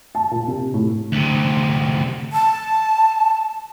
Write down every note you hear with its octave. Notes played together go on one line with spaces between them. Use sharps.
A5
A#2
C3
A2
D2 C3
A5